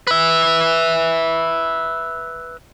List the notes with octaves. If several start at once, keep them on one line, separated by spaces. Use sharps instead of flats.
B4 E5